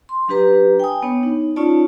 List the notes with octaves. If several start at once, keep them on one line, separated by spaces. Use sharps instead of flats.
C6
F#3 D4 G4 B4 A#5
G5 G#5 D#6
B3 D4 C#5
D#4
C#4 D#4 F4 C#5 D5 A5